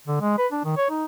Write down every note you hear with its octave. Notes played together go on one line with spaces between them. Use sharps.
D3
G#3
B4
D4
D#3
C#5
D#4